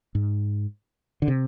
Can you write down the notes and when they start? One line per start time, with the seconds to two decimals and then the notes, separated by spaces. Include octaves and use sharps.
0.15 G#2
1.22 D3
1.28 C3